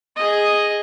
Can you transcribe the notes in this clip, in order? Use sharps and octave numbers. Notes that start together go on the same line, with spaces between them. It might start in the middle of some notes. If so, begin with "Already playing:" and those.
G#4 D#5